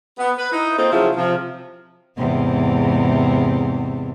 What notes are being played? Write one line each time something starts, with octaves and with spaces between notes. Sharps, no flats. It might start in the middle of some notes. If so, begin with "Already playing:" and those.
B3
B4
D#4 E4
A#3 C4 D#4 F4 A4 C5
C#3 F3 F#3 E4 F4 G#4
C3 F3 F4
E2 G#2 C3